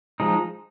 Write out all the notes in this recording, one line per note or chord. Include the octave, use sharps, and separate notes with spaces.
F3 G#3 D#4